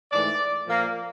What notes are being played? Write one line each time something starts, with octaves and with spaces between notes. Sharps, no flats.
G#2 E3 A3 D5
A#2 F3 A#3